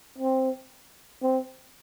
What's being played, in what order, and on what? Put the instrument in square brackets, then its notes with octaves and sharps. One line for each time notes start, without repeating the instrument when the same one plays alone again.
[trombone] C4
C4